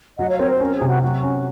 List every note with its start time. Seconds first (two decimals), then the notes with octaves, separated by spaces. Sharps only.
0.18 F#3 D#5 F#5
0.29 C#5 F5
0.39 C4 A#4 C#5
0.50 C5
0.60 C#4 A#4
0.75 G#4
0.81 C3
0.88 F#4
1.02 F#3 F#4
1.23 C#4